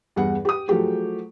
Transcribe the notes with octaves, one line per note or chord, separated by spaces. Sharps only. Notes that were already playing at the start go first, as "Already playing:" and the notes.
E2 G2 G3 G#4 F#5
G4 D#6
F3 F#3 A3 G4 G#4